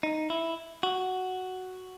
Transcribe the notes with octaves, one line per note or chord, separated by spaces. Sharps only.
D#4
E4
F#4